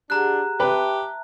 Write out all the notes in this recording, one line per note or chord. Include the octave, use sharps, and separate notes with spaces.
D4 G4 G#4 F#5 A#5 F#6
G4 B4 E5 A5